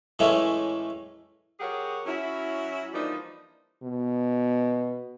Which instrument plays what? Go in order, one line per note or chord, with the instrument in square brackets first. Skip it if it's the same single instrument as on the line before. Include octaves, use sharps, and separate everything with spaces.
[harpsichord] A2 E3 G#3 A3 C#4 E4
[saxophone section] F#3 G4 G#4 A#4 C#5 F#5
F#3 C#4 E4
E3 F3 G3 A#3 D4 D#4
[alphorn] B2